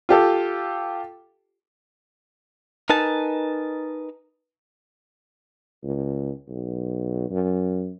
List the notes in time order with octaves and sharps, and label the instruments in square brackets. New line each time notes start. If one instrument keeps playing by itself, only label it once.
[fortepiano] F4 G4 A4
[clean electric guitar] D#4 A#4 B4 G#5 A5
[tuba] C#2
B1
F#2